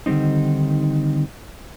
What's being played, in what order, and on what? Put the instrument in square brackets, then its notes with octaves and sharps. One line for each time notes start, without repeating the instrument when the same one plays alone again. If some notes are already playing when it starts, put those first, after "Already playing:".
[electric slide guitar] D3 D#3 G3 C4 D#4